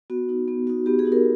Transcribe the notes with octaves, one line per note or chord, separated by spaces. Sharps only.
B3 F#4
D#4 F#4
B3
D#4 F#4
B3 G4
G#4
D#4 F#4
A#4